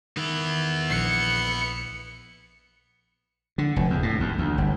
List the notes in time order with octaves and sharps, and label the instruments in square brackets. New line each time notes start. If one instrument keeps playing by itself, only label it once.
[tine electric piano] D#3 [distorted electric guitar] B3 E4
[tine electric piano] A#1 F#6 [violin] C#7
[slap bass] D3
F1
E2
A2
D#2
D2
G1